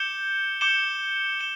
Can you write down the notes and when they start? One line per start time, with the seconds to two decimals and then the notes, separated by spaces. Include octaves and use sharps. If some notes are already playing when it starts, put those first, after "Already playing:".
Already playing: D6 G6 C#7 E7 G7
0.61 D6 G6 C#7 E7 G7
1.40 E7 G7